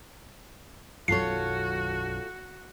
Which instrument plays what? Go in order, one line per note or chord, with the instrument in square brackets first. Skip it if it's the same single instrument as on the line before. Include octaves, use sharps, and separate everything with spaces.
[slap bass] B1 F#2 D#3 [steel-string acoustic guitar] F4 A4 C#5 [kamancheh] F#4 [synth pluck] C7